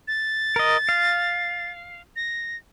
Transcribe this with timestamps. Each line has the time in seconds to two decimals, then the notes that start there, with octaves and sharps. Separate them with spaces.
0.08 A6
0.56 A#4 D#5
0.89 F5
2.16 A#6